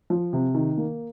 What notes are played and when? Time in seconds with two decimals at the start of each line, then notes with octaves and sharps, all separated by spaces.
0.10 F3
0.33 C3
0.54 D#3
0.77 A#3